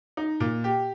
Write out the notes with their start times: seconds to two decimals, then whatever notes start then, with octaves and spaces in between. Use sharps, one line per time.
0.17 D#4
0.40 A#2
0.64 G4